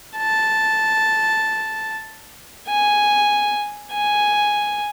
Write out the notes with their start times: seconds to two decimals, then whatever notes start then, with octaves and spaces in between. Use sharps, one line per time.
0.17 A5
2.68 G#5
3.93 G#5